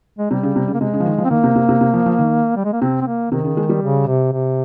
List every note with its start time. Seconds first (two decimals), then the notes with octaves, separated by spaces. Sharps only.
0.18 G#3
0.31 C3 G3
0.43 C#3
0.56 C3
0.68 C#3
0.74 A#3
0.80 C3 G#3
0.94 C#3
1.00 F3
1.06 D#3
1.18 F3
1.25 C4
1.30 D#3 A#3
1.43 C3
1.55 C3
1.69 C3
1.81 C3
1.93 F3
2.06 F3
2.19 D#3
2.56 G3
2.65 G#3
2.73 A#3
2.82 C3 C4
3.01 C4
3.07 A#3
3.31 C3 D#3
3.45 C#3
3.57 G#3
3.69 G3
3.82 C#3
4.07 C3
4.33 C3